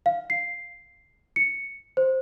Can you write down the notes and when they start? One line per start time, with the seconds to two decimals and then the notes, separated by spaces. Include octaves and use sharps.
0.06 F5
0.30 C7
1.36 C#7
1.97 C5